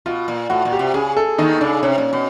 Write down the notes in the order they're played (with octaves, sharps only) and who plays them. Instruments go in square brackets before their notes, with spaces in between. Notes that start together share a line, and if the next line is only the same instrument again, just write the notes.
[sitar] B2 [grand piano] F4
[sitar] A#2
[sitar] A2 [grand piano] F#4
[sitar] A#2
[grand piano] G4
[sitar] C3
[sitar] C#3 [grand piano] G#4
[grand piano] A4
[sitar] D#2 D#3 [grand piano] D#4
[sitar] C#3 [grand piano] D4
[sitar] C3 [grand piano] C#4
[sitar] A#2
B2